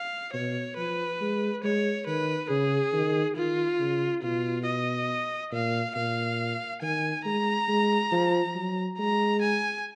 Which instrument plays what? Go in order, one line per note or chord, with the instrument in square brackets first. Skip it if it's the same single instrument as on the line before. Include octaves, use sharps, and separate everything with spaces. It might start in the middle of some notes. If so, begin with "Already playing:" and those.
Already playing: [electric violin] F5
[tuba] B2 [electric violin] C#5
[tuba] F3 [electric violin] B4
[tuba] G#3
[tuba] G#3 [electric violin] C#5
[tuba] D#3 [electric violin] B4
[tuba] C#3 [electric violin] G#4
[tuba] D#3
[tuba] D#3 [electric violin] F4
[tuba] C#3
[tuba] B2 [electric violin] F4
[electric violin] D#5
[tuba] A#2 [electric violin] F5
[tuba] A#2 [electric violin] F5
[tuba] D#3 [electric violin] G#5
[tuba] G#3 [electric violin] A#5
[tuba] G#3
F3
F#3
[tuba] G#3 [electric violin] A#5
[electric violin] G#5